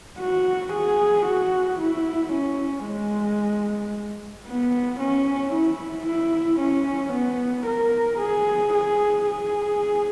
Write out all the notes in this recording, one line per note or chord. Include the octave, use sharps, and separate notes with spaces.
F#4
G#4
F#4
E4
C#4
G#3
B3
C#4
E4
E4
C#4
B3
A#4
G#4
G#4
G#4